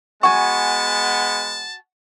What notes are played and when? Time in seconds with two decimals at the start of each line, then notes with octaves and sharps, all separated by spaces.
0.23 G#3 B3 F#4 G#5 A5 C#6